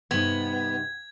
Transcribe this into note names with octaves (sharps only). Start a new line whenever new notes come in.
G2 C3 B3 D#4 G#6